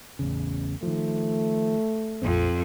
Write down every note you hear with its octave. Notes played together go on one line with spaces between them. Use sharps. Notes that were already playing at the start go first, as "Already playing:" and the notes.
A1 E2 C#3
D#3 F3 A3
A#1 F2 C4